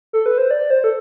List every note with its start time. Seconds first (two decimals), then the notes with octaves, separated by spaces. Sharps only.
0.13 A4
0.26 B4
0.38 C5
0.51 D5
0.70 C5
0.84 A4